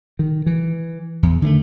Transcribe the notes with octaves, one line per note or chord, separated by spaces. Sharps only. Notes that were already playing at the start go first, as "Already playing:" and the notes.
D#3
E3
E2
D3 D#3 G3 A3